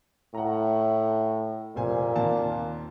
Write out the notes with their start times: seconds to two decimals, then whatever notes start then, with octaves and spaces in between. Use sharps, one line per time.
0.35 A2 F#5 A#5
1.76 F1 A#2 C5 G#5
2.16 D#2 A#3 A5